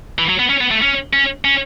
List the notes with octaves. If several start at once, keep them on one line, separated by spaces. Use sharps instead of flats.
E3
F#3
B3
C#4
B3
A3
C#4
C#4
C#4